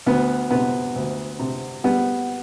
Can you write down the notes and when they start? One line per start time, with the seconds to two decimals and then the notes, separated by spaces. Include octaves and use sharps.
0.06 D2 B3
0.51 C3 B3
0.96 D2
1.39 C3
1.84 G3 B3